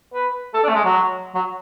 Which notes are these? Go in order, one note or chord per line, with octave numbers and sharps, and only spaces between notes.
B4
A4
D4
A3
G#3
F#3
F#3